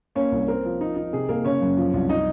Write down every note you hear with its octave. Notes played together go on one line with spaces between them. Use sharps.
A#3 C#4 C#5
C2
C4 A#4
F3
D#4
D#4
C3 G#4
A#3 A#4
C#3 C#4 C#5
F#2
F3
C2
D#4 D#5